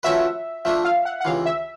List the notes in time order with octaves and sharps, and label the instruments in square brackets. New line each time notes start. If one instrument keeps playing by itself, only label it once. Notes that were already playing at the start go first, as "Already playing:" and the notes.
[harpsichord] F3 A3 C#4 F#4 B4 [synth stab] E5
[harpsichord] F3 A3 D4 [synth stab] E5
[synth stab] F5
F#5
F#5
[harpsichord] C#2 C3 E3 [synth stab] F5
[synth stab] E5